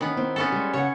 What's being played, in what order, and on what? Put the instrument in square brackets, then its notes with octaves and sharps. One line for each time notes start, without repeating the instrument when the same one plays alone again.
[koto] D#3 B3 [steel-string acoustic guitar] C#4
[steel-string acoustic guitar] C4 E4
[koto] B3 C#4 A4
[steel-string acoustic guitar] G3 G#3
[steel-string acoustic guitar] C#3 E5 F#5 [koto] C#5